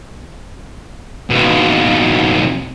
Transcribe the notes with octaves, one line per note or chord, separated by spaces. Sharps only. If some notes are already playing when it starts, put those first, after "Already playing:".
D#2 B2